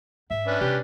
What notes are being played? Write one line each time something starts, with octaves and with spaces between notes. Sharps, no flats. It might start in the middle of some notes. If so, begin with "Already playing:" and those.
G#2 E5
C#4 D4 B4
C3 G3 G4